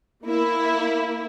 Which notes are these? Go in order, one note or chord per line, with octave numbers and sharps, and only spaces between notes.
A#3 E4